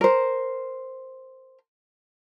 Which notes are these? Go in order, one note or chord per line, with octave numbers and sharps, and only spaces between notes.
A#4 C5